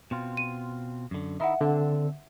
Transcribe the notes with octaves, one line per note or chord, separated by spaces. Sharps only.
B2 C4 F4
D#7
F#2 D3
D#3 D#4 E4 E5 F#5
D3 C4 D4